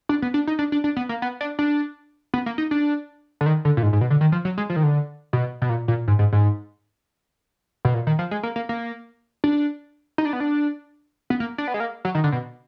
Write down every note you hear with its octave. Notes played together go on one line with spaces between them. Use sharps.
D4
B3
D4
D#4
D4
D4
D4
B3
A#3
B3
D4
D4
B3
A#3
D#4
D4
D3
D#3
D3
A#2
G#2
G#2
B2
D3
D#3
F3
F#3
G#3
F3
D#3
D3
B2
B2
A#2
A#2
G#2
G#2
G#2
B2
A#2
D#3
F3
G#3
A#3
A#3
A#3
D4
D#4
D4
B3
D4
B3
A#3
D4
B3
G#3
A#3
F#3
D#3
D3
B2